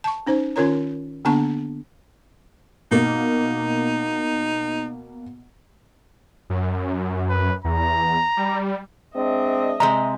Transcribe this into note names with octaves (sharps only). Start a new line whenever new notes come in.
A5 C#6
C#4 D#4 C5
D#3 C#4 F4 A#4 C#5 A#5
D3 A#3 B3 D4 A5 C#6
B2 A#3 D#4
F#2
B4
E2 A#5
G3
G#3 C4 D4 D#5 E5
C3 G#3 C4 A#5